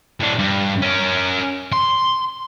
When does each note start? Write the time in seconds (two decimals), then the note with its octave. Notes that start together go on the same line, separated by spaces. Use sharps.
0.20 A2 D4
0.39 G2
0.82 C#4 A#4
1.73 C6